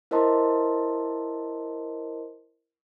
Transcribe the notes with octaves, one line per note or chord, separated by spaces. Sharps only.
E4 A#4 C5 D#5 A5 C6